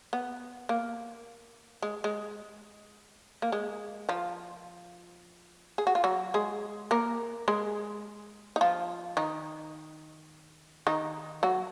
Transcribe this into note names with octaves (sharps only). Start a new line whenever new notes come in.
B3
A#3
G#3
G#3
A#3
G#3
F3 F4
G#4
F#4
F4
F#3 F#4
G#3 G#4
A#3 A#4
G#3 G#4
D#4
F3 F4
D#3 D#4
D#3 D#4
F#3 F#4